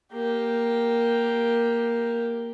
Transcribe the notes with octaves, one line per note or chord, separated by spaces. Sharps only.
A#3 G4